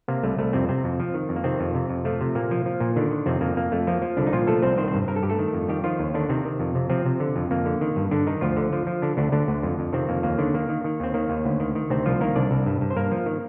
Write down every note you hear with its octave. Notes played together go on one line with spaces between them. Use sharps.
C3 A#3
C2 A3
C2 A3
F2 C3 C4
C3 C4
F2
F3
D#3
F2
A#3
C3 D#3 C4
F2
C3
F2
F3 A3
C3
A#2 A#3
F3
F3
A#2
D3 D#3 D4
D#3
F2 C3 C4
F2 A#3
F2 A#3
F2 A3
F3 A#3
F3
C2 D3 D4
D#4
A#2 F3 F4
F3 A3 A4
C2 C4 C5
D#3 C4 C5
C4 C5
G2
G2 A#4
A4
G2 G4
A3 A4
D#3
F2
D#3 G3 G4
D#3 F3 F4
D#2
D3 D#3 D4
C3 D#3 C4
D#3
F2
C3
C3 F3 C4
C3
D3
F2
F2 A#3
D3
D#3
G2
G2 D3 D4
D#3 D#4
D2 F3 F4
D3
F3
F3
D3 D4
D2 D3 D4
D2 D3 D4
D2
F2
F2
C3 D#3 C4
F2 A#3
D#2 A#3
D3 D#3 D4
D#3 A#3
D#3
D#3
D#2 C4
D#3 A#3
D#2
D2
D#3
D#3
D2 C3 C4
C2 F3 F4
D#3 A#3 A#4
C2 D4 D5
C2
G2
G2
C5
G2 A#3 A#4
F3
D#3